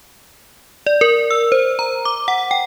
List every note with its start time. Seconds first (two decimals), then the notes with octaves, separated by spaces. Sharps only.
0.87 D5
1.01 A#4
1.31 E6
1.52 C5
1.79 A#5
2.05 D6
2.28 F#5
2.51 G5